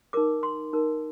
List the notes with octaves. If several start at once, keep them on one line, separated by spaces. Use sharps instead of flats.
D#4 A#4 D6
C6
D#4 A#4